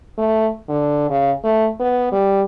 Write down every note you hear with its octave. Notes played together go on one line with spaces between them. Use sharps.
A3
D3
C#3
A3
B3
G3